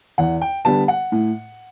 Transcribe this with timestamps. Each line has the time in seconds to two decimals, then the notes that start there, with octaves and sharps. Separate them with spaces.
0.18 E2 F#5
0.41 G5
0.65 D3 G3 B3 A5
0.88 F#5
1.12 A2